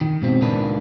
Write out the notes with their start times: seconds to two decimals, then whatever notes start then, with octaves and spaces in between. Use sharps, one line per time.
0.01 D#3
0.22 G#2 B2 C4
0.41 C#2 A#2 D#3 D4 B4